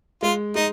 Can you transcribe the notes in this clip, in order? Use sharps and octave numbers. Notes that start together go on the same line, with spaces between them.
G#3 F4
G#3 D#4